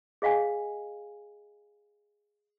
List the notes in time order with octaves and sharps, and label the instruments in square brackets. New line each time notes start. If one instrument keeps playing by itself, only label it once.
[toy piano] G#4 D#5 F5 F#5 G#5